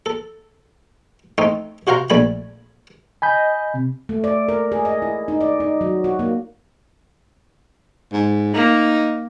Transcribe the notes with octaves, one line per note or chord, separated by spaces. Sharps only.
A4
A3 C4 D#4
C3 F#4 C5 F5 A#5
A#1 A3 D5 G#5 B5
D#5 G#5 B5 G6
C3
A3
D5
A#4
G#4
D#5
E4
D#4
D5
D#4
F#3
F#4
A#3
G#2
A#3 D#4